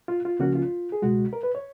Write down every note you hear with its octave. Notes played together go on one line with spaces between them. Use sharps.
F4
F4
C#2 C#3 F3 A#3 C#4 F#4
F4
G#4
C#2 B2 G#3 F#4
A#4
B4
C#5